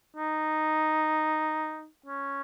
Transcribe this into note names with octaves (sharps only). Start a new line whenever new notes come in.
D#4
C#4